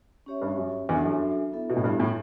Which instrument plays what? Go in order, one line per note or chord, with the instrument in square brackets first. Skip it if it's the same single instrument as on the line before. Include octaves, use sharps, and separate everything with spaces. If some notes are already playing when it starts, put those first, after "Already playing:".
[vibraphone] C#4 G4 C#5 E5
[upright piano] G2
F#2
[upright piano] E2 [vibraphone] D4 F#4 A4 E5
[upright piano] F#2
[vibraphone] B3 E4 A4 E5
[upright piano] B2
A2
G2
A2